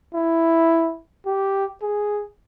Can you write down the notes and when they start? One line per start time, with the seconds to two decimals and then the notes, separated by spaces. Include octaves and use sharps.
0.14 E4
1.26 G4
1.82 G#4